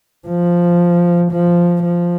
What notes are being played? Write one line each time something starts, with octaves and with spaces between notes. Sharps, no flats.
F3
F3
F3